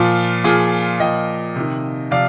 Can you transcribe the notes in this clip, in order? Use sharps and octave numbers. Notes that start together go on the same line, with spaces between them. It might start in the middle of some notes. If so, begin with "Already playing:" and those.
Already playing: A#2 F3 F4
A#2 F3 F4 G#4
A#2 F3 D#5 G5
C3 D#3
C3 F3 D5 F5